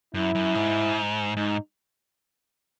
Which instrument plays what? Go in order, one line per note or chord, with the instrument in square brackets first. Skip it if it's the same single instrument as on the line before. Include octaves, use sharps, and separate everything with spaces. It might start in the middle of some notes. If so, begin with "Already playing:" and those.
[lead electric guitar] F#2 [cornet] E4
[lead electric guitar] F#2
G#2
[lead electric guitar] G#2 [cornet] D#4